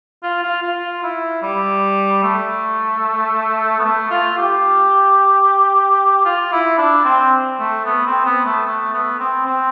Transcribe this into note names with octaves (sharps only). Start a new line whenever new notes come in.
F4
F4
F4
E4
G3
A3
B3
A3
F4
G4
F4
E4
D4
C4
A3
B3
C4
B3
A3
A3
B3
C4
C4